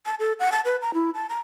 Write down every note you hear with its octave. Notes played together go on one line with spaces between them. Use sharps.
A5
A4
F#5
A5
B4
A#5
E4
A5
A#5